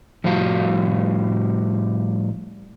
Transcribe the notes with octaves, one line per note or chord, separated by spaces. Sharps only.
A2 F3 G3 F#4 F5